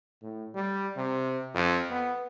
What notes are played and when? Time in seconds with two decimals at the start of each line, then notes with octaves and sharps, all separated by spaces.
0.23 A2
0.54 G3
0.96 C3
1.54 F2
1.91 B3